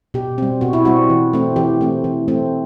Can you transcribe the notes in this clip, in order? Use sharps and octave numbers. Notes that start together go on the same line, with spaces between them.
B2 G4
G3 C4
B2 F#4
E4
G3 C4 F#4
E3
A3 C4
E3 G4
A3 C4
E3
A3 C4